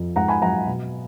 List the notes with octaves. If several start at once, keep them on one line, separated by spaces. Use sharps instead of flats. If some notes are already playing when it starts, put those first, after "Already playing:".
Already playing: F2
G#2 F#5 A#5
G#5 B5
F#3 F#5 A#5
B2